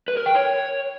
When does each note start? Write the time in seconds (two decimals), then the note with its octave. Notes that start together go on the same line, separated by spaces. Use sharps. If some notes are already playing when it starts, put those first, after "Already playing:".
0.08 B4
0.17 A#4
0.26 G5
0.35 C#5